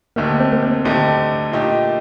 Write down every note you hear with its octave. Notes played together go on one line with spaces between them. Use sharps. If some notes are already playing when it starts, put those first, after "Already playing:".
D2 D3 A3 A#3 D#4 G4
C4
A#3
C4
D2 D3 A3 D#4 G4
A#2 A3 D#4 G4